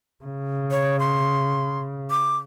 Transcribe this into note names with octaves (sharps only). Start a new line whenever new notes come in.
C#3
C#5
C6
D6